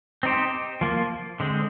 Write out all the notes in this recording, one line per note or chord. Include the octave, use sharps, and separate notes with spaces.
C4 D#4 G4 C5
F3 A#3 F4
D3 G#3 C4